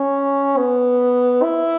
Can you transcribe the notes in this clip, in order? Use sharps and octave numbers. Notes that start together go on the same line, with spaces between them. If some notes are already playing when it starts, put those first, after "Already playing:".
Already playing: C#4
B3
E4